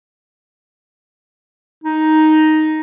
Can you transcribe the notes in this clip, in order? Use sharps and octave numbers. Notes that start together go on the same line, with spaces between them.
D#4